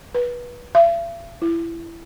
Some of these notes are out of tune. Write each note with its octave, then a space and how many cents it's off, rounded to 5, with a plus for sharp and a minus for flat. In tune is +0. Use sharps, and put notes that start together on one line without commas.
B4 -25
E5 +45
E4 +20